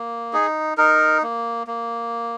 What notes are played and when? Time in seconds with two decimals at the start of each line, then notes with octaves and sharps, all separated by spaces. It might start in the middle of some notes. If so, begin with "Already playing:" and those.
Already playing: A#3
0.33 D#4 G#4
0.78 D#4 A#4
1.23 A#3
1.67 A#3